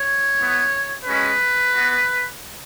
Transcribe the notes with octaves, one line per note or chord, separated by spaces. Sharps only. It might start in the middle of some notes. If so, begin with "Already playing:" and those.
Already playing: C#5
B3 E4
G#3 C#4 F#4 B4
B3 F#4